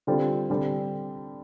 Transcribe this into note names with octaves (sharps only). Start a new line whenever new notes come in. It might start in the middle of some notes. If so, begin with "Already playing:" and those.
D3 G3 C4 F4
D3 G3 C4